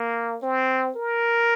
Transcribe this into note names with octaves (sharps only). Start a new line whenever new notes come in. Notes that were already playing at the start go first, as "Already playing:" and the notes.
Already playing: A#3
C4
A#4